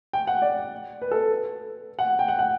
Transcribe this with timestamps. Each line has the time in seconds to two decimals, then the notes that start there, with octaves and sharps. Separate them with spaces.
0.13 G5
0.27 F#5
0.42 D5
1.02 B4
1.11 A4
1.99 F#5
2.19 G5
2.28 F#5
2.39 F#5